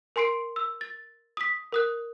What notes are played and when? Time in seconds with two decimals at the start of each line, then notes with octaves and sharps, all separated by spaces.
0.16 A#4 G#5 C6 C7 D7
0.56 E6
0.81 A6
1.37 D#6 B6
1.72 A#4 D#6 F#6